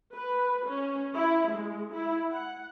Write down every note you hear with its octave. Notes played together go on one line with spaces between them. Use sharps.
B4
C#4
E4
G#3
E4
F#5